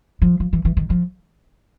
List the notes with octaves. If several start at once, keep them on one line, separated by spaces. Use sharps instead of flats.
F3
F3
E3
E3
D#3
F3